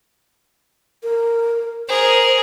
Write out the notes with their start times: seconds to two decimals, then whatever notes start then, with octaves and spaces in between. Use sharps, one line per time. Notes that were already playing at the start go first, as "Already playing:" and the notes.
1.03 A#4
1.89 G#4 A#4 C5